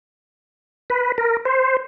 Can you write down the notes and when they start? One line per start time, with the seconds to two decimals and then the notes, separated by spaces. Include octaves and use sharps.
0.90 B4
1.18 A#4
1.45 C5